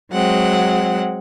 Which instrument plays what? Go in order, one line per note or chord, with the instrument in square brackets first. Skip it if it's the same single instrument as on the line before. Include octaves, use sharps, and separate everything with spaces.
[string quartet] F#3 G#3 C4 F#5